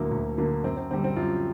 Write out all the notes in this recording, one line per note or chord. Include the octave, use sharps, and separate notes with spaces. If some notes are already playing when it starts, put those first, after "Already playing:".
Already playing: D2 D3 F#3 A#3 E4
D2
D3 F#3 A#3
F#2 C4
C4
D3 G3 C4
C4
F#2 F4